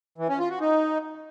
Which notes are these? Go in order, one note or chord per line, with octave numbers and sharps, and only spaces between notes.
E3
C#4
F4
F#4
D#4